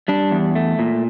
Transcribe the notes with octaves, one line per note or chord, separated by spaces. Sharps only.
G3 D4
E2
A3
A#2